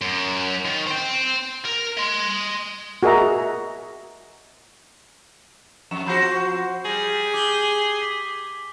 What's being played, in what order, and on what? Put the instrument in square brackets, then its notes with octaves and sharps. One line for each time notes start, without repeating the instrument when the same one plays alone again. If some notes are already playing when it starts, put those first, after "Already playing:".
[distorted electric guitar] F#2
D#3
C5 G5
A#4
D#5 C6
[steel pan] F#4 G#4 A#4 D#5 E5 A#5
[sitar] F2 [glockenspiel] E7
[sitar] F3 C4 F#4 [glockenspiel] B5 G6 C7
[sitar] G3 [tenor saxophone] G#4 [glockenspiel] A#6
[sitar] G4 [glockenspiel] D6 G7
[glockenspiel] D6 B6